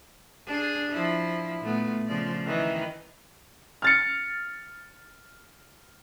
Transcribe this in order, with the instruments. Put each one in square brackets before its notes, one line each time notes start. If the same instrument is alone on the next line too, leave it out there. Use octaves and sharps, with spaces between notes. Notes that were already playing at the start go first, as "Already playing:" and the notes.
[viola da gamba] D4 G#4
F3 E4
A#2 A3 B3
C#3 F3 D5
D#3 E3
[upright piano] F6 A6 C#7